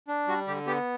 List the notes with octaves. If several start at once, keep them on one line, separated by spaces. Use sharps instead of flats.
D4
G3 F#4
D3 G4
B3 G4